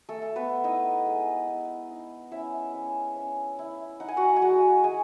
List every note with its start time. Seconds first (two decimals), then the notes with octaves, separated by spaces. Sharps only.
0.09 A3 A4
0.22 A3
0.36 B3 B4
0.64 D#4 E4 D#5
1.06 G#3
1.48 D#4
1.91 D#4
2.32 C#4 E4 E5
2.74 C#4
3.16 C#4
3.59 E4
4.00 D#4 F#5
4.08 G#5
4.17 F#4 F#5
4.36 G#5
4.42 G#3 F#4 F#5
4.84 G#3 G#4 G#5